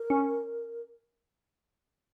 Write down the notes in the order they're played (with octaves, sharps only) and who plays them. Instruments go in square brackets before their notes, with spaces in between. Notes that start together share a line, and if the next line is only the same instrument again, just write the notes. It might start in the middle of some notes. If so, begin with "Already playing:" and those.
Already playing: [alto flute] A#4
[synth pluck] C#4